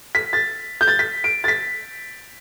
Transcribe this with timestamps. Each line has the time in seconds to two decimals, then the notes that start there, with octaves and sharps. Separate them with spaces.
0.15 B6
0.33 A6
0.81 G6
0.87 A6
0.99 B6
1.24 D7
1.44 A6
1.48 B6